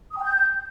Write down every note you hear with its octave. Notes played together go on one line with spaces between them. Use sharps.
D#6
G5
G6